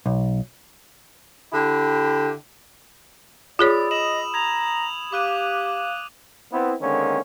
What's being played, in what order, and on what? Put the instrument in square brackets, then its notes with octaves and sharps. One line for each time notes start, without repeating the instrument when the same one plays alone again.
[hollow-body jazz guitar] B1
[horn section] D3 E4 G4
[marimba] F4 G#4 C#5 [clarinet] D5 [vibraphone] B5 E6 [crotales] D#6
[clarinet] D#5 [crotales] E7 F#7
[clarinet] A#5 [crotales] G#6 E7 F7
[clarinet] G4 [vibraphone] F5 [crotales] D6 F#6 D#7
[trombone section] B3 C4 E4
D3 D#3 G#3 A#3 C4 C#4